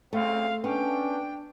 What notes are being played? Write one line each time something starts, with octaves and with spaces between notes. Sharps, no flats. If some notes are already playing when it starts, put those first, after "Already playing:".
D2 C#3 A3 C4 F5
B3 C#4 D4 G5